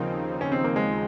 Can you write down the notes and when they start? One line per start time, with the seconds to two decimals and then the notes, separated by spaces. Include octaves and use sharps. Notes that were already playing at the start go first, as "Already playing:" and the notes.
Already playing: D#2 C#3 F3 A#3 C4 D#4
0.41 C#4
0.52 C4
0.64 A#3
0.76 G#3